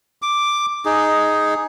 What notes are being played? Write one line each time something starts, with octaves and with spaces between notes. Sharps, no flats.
D6
D#4 G#4